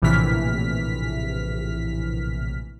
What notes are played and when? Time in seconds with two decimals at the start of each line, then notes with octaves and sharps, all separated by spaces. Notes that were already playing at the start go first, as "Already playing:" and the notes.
0.02 A#1 A2 C3 E3 F6 B6